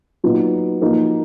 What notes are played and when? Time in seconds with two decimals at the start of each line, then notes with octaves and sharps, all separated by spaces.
0.24 A#2 F#3 B3 D#4
0.81 F3 A#3 D#4 F#4 A#4